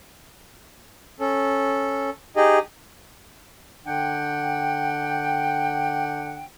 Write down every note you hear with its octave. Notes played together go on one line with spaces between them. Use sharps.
C#4 A4
D#4 G4 G#4 D#5
D3 D4 F#5 G5